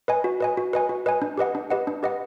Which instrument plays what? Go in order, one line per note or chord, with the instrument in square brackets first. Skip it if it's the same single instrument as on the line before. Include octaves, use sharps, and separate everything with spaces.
[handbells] B4 D#5 G#5
F#4
B4 D#5 G#5
F#4
B4 D#5 G#5
F#4
B4 D#5 G#5
D4
G4 B4 D#5 F#5
D4
G4 B4 D#5 F#5
D4
G4 B4 D#5 F#5